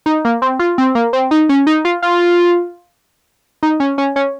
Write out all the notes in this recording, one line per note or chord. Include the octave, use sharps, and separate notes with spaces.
D#4
A#3
C4
F4
C4
A#3
C4
D#4
C#4
D#4
F4
F4
D#4
C#4
C#4
C#4